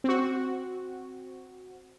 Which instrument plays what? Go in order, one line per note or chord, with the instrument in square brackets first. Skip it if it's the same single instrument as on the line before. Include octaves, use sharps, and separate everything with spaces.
[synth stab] C4 F#4